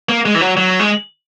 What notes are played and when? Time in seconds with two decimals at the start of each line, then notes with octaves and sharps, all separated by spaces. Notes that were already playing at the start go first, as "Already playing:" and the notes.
0.09 A#3
0.26 G#3
0.35 E3
0.41 F#3
0.57 F#3
0.80 G#3